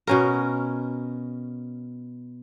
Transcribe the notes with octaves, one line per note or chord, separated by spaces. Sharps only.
B2 C#4 A#4